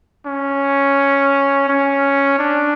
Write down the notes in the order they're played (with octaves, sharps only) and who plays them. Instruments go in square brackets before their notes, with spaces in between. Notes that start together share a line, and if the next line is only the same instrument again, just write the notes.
[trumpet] C#4
C#4
D4